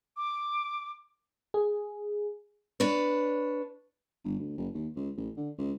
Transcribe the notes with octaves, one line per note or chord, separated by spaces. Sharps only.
D6
G#4
D4 B4 C#5
G1
D2
F#1
D#2
C#2
A1
D3
C#2